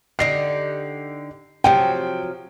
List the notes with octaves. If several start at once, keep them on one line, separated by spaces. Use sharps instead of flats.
D3 D#4 G4 C7
C3 F3 F#3 G5